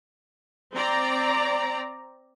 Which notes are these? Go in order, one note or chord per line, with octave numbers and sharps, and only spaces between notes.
C4 D5 A#5